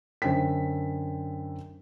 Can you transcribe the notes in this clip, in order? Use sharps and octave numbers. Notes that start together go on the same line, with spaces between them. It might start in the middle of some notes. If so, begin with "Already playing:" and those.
F#2 D3 C5 G5 B6